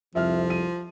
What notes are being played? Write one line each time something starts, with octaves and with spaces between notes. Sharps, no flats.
C2 F2 C3 F3 E5 F6
D#7